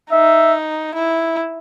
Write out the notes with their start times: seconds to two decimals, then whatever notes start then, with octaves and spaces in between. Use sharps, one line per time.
0.11 D#4 E5
0.95 E4